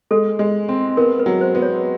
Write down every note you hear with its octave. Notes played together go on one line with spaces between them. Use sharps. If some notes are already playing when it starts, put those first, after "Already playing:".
G#3 A4
G#3
C4
B3 A#4
B4
F#3
C5
B3
C#5